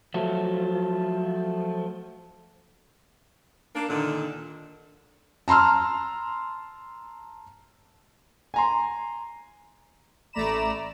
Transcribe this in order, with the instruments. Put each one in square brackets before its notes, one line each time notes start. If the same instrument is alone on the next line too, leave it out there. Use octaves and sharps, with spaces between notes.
[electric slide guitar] F3 F#3 A3
[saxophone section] A#3 D4
A#2 D3 D#3 D4
[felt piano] A5 A#5 C6 E6 F6
[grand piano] G#5 A#5 C6
[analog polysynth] A1 A3 D5 A#5 B5 E7